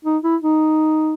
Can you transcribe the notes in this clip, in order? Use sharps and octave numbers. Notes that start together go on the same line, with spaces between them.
D#4
E4
D#4